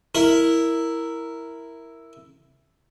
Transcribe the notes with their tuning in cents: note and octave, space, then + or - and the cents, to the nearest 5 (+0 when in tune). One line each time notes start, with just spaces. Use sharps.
E4 +0 A#4 -5